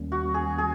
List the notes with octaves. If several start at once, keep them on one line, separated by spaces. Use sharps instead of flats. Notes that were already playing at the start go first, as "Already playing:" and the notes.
Already playing: D#2 D#3 G3 A#3 C#4
F#4
G#4
G#4